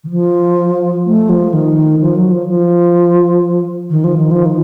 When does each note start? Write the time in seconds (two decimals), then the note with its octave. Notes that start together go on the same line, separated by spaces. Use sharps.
0.04 D#3
0.10 F3
1.06 A3
1.29 F3
1.53 D#3
2.01 F3
2.16 F#3
2.31 F3
2.48 F3
3.90 D#3
4.04 F3
4.17 D#3
4.31 F3
4.45 D#3